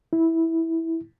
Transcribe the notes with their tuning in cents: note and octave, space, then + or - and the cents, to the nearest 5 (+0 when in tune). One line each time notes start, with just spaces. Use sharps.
E4 -10